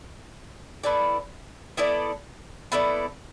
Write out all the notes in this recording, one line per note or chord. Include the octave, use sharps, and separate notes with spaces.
B3 E4 A4 D5
B3 E4 A4 D5
B3 E4 A4 D5